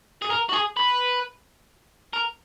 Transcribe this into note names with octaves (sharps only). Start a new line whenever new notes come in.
G#4
A#4
F#4
G#4
B4
A#4